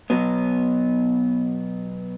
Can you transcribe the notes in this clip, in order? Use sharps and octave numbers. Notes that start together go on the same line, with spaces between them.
B2 F#3 B3